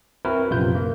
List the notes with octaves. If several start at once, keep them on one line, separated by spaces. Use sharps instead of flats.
C4 E4 F#4 A#4 B4
A#1 F#2 C3 F4 B4 G6
A#3